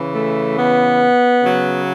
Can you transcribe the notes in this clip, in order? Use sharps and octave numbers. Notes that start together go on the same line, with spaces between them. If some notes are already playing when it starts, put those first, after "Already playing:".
Already playing: C#3 E3
A3
B3
C#3 F#3